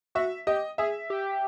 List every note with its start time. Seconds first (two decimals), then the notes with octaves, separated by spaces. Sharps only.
0.15 F#4 E5
0.47 G4 D#5
0.78 G#4 E5
1.10 G4